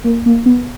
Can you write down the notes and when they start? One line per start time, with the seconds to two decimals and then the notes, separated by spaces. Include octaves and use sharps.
0.04 A#3
0.26 A#3
0.46 B3